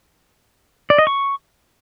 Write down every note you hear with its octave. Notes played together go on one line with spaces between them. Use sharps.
D5
D#5
C#6